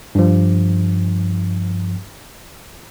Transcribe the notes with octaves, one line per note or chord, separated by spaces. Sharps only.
G2 F3